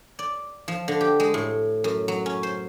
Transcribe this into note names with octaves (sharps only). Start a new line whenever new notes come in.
D5
F3
D3
G4
G#3
A2
F#2
F#3
C#4
C5